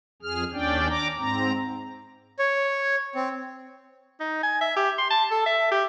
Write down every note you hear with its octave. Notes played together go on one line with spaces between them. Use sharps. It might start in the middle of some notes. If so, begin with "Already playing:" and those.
F2 G#4 F6
D#2 C#4 D4 D5 G5
A#5 D6
G#2 C4 A#5
C#5
C4
D#4
G#5
E5
G4
C6
A5
A4
E5
G4